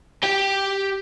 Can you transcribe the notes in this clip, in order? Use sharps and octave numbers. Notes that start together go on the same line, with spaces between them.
G4 G5